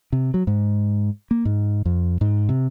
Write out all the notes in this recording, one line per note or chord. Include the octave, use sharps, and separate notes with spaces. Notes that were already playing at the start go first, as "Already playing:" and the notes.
C3
F#3
G#2
A#3
G#2
F2
G#2
C3